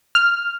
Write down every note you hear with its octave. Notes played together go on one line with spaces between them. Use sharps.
F6